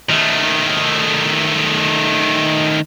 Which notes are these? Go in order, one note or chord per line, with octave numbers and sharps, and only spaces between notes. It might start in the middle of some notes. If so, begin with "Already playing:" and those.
D#3 A3